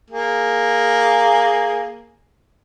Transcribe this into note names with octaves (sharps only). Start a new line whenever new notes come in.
A#3 G#4